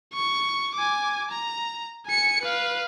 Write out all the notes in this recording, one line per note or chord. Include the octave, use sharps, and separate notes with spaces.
C#6
G#5 D6
A#5
G#5 C#7
B4 F5